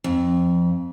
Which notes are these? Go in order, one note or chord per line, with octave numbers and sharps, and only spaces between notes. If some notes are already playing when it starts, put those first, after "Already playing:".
F2